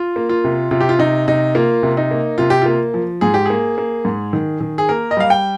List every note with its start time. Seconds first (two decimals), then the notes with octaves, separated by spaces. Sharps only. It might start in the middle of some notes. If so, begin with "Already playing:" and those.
Already playing: F4
0.16 A#3
0.29 F4
0.44 C3
0.71 C3 F4
0.81 G4
0.89 F4
0.99 C3 D#4
1.28 C3 D#4
1.55 A#3 F4
1.83 C3
1.97 D#4
2.11 A#3
2.38 C3 F4
2.50 G4
2.62 A#3 F4
2.94 F3
3.21 G#2 G#4
3.34 G4
3.46 A#3 G#4
3.78 A#3
4.05 G#2
4.33 D#3
4.61 D#3
4.78 G#4
4.89 A#3 A#4
5.11 D#5
5.17 G3 F5
5.30 G5